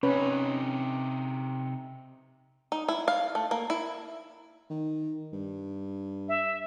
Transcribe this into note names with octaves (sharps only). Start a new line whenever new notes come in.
C3 C#4 D#4 B4 C#5
D#4
E4
F5
A3
A#3
E4
D#3
G2
E5